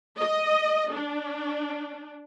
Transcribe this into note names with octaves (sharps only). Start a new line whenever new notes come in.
D#5
D4